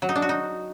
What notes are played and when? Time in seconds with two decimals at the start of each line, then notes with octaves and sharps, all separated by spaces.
0.02 F#3
0.09 D#4
0.16 D4
0.22 F#4
0.29 D#4